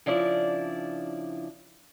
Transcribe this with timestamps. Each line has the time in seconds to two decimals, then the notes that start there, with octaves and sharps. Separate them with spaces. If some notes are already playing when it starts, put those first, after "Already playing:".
0.06 C#3 F3 D4 E4 D5